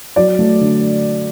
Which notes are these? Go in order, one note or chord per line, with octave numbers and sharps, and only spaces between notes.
F#3 D5
A3
D3